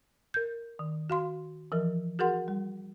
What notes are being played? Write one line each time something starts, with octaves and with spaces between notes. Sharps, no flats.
A#4 G6
D#3
F#4 F5 C6
E3 F3 A#4
F#4 G#4 A#4 F#5 C6
G3